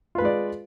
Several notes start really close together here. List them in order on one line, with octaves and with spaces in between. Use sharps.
F4 B4 G#3 D5